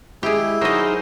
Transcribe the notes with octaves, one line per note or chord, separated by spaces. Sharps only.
G#3 E4 G4 G#4
F#3 D#4 G#4 A#4 C5 D#5